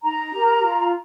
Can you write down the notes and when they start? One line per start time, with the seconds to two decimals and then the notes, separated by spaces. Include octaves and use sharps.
0.03 D#4 A#5
0.32 G4 A#4
0.61 F4